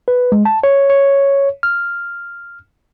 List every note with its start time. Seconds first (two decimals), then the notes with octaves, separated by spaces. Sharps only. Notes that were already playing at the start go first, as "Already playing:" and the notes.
0.08 B4
0.32 G#3
0.45 A5
0.64 C#5
0.90 C#5
1.63 F6